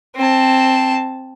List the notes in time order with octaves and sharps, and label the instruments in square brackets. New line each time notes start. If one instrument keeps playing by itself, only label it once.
[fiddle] C4 A5